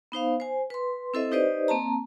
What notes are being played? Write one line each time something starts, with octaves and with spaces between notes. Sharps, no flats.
B3 D#4 C5 F5
C5 G#5
B4 C6
C4 E4 A4 C5 D#5 E5
D#4 G4 B4 C5 D5 D#5
A#3 C4 A5 A#5